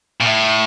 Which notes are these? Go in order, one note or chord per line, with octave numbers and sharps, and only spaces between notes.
A#2
A2